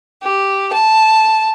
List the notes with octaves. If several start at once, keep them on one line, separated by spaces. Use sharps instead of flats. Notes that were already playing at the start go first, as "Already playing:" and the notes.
G4
A5